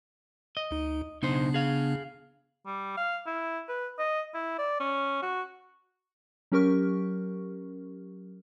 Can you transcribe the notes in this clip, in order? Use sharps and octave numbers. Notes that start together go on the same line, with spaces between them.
D#5
D2 D#4
B1 C#3 B3 D4 D#4 C5
G#4 F5
G3
F5
E4
B4
D#5
E4
D5
C#4
F#4
F#3 C#4 G4 A#4 C#6 F6